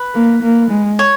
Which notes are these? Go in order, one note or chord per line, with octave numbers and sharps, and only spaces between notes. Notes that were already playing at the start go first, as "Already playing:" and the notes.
Already playing: B4
A#3
A#3
G#3
C#5